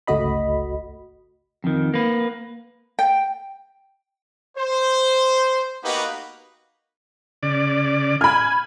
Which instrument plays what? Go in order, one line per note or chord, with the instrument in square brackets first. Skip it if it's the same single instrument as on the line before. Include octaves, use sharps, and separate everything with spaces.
[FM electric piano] G1 C#2 A3 F#4 D#5 B5
[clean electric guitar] F2 D#3
A#3 B4
[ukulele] G5
[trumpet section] C5
A#3 B3 D#4 F#4 G4 B4
[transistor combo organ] C#3 D5
[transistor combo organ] G#5 [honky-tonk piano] B5 F6